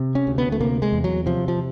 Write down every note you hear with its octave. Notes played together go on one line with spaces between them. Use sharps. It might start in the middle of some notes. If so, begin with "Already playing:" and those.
Already playing: C3
C#4
D2
B3
A3
C3 A#3
G#3
E2
F#3
C3 F3
F3